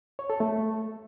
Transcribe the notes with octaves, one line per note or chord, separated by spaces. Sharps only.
C#5
A4
A3